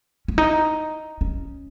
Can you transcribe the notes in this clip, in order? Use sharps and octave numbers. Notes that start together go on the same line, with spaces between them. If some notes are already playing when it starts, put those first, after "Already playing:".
C#4
D#4
C#4